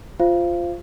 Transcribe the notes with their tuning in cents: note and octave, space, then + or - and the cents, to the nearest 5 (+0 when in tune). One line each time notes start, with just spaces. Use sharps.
F4 +0 C5 +0 F5 -25